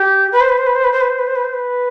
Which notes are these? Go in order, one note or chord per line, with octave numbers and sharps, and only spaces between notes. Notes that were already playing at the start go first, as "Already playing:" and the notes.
Already playing: G4
B4
C5
B4
C5
B4
C5
B4
C5
B4
C5
B4
C5
B4
C5
B4